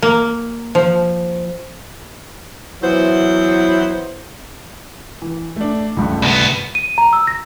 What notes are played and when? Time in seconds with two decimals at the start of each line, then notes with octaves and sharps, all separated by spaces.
0.02 A#3
0.75 F3
2.82 E3 F#3 B3 E4 C5
5.22 E3
5.56 A3 D4
5.97 C#2 G2 A3
6.22 C2 B3
6.75 D#7
6.98 A#5
7.13 E6
7.27 A#6